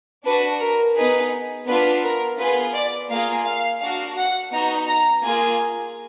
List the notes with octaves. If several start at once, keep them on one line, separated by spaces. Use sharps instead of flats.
D4 F#4 B4
A#4
B3 D#4 G#4 B4
B3 D4 F4 B4
A#4
B3 F4 G#4 B4
D5
A#3 F4 G#4 F5
F5
D4 F#4 F5
F#5
B3 D#4 F#4 A#5
A#5
A#3 F4 G#4 G#5